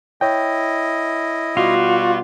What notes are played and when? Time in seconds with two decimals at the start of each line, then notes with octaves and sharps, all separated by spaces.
0.21 E4 C#5 D#5 G5
1.57 B2 G3 F4 F#4